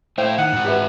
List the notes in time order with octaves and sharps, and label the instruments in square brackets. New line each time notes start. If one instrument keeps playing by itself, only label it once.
[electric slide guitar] A3 E4 [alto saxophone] C5 [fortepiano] E5 F5 G5
[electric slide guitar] D#3 [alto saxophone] F#5
[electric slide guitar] G#2 F#4
[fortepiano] G4 B4 E5